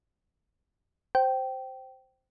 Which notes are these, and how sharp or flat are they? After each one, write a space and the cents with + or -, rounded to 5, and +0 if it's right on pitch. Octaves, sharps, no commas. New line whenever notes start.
C5 +0 G5 -15